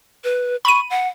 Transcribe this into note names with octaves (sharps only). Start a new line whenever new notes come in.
B4
B5 C#6 D#7
F#5